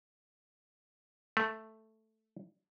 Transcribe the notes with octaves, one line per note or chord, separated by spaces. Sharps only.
A3